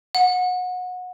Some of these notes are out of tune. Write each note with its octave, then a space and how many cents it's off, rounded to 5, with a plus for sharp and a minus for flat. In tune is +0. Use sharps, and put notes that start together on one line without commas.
F#5 -25